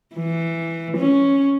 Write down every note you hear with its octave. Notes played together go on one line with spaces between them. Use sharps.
E3
C#4